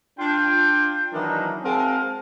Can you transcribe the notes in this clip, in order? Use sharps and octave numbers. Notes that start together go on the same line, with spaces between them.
D4 F4 G5
D#3 E3 F#3 A#3 D4 D#4
G#3 C4 F#4 A#4 F5 A5